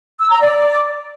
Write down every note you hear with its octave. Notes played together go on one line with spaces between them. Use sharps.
E6
A#5
D5